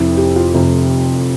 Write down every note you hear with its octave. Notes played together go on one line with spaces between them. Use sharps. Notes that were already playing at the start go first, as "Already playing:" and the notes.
Already playing: F1 F2 C3 E4
G4
F4
F1 F2 C3